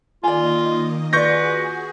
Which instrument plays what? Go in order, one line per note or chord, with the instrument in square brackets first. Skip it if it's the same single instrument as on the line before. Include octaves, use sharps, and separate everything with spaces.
[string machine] D#3 A#3 D#5 [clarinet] F4 [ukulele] D5 G#5
[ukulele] F4 D5 [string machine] F#4 G#4 [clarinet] B4 [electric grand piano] C#6 G6 A#6